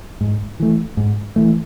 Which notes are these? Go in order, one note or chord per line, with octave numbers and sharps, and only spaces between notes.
G#2
E3 A3
G#2
E3 A3